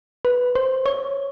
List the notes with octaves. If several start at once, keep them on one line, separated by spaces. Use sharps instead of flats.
B4
C5
C#5